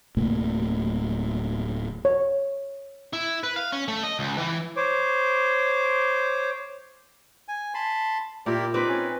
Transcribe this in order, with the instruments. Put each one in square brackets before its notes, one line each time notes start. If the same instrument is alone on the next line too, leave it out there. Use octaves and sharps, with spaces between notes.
[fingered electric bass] D1 C3 A3 A#3
[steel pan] C#5
[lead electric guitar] E4
B4
F5
C#4
A3
D#5
C#2
E3
[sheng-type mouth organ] C5 C#5 D6
[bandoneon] G#5
A5 B5 C6
[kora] A#2 [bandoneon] E4 A#4 D5 [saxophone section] G4
[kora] C4 D5 [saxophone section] D#4 B4 [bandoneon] D6
[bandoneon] C#4